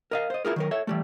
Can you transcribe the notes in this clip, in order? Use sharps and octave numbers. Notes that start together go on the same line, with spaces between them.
A#4 D#5 F5
C5 D#5
E4 F4 G#4 A#4
D#3 F#3 A#4
A4 C#5 E5
E3 G3 A3